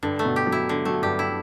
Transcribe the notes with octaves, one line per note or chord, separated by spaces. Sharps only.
G2 D3
A3
B2
G4
F#3
E4
D3
F#3 A3
G2 G4
E4